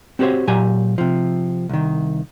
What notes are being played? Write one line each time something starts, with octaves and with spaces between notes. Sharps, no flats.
C4 F#4 G4 C5 C#5
A#2 F#3 G4 G#5
C3 F3
C2 D#3